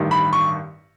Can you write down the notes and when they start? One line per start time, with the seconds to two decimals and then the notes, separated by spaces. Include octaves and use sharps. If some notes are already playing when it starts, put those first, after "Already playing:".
Already playing: A1 G2 D#3
0.11 B5
0.33 C#6